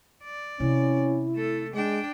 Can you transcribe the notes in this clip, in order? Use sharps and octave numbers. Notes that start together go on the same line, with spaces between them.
D5
C3 D#3 C#4 E4
A3 A4
G#3 D4 G5